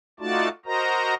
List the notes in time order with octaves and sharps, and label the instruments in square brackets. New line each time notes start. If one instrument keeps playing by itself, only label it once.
[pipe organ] A3 D#4 F4 F#4 D5 A5
F#4 A#4 C5 D#5 A#5